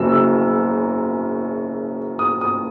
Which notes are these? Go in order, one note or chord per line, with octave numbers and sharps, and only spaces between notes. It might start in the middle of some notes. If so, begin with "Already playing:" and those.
Already playing: F#1 F#2 C#3 F#3 E6
E6
D#6
D#6